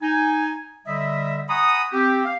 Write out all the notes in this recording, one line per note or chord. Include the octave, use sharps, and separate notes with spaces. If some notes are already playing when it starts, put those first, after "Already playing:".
D#4 G#5
D3 G3 D#5 E5
F#5 G#5 A#5 B5 C#6 D#6
C4 G4
F5